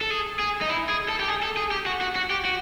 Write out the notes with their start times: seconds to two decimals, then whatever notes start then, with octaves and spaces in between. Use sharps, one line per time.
0.01 A4
0.10 G#4
0.39 G#4
0.61 D#4
0.69 E4
0.89 G#4
1.08 A4
1.19 G4
1.28 G#4
1.43 A4
1.57 G#4
1.71 G4
1.86 F#4
2.01 F#4
2.16 F#4
2.30 G4
2.45 F#4